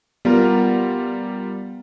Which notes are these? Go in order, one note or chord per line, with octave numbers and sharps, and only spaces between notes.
G3 B3 F4 A#4